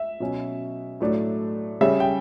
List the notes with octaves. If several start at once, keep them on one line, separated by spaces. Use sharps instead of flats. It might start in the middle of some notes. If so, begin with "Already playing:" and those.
Already playing: E5
B2 F#3 C#4
A2 F#3 A3 D4
C#3 G3 C#4 E5
G5